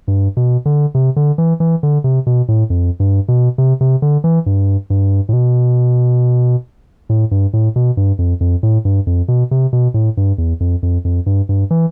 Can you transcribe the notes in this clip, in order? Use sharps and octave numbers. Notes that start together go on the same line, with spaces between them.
G2
B2
D3
C3
D3
E3
E3
D3
C3
B2
A2
F2
G2
B2
C3
C3
D3
E3
G2
G2
A2
B2
A2
G2
A2
B2
G2
F2
F2
A2
G2
F2
B2
C3
B2
A2
G2
E2
F2
F2
F2
G2
G2
E3